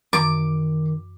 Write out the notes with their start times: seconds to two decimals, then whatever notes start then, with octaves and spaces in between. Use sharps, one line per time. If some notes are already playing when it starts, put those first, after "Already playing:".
0.13 F#2 D#3 E3 D6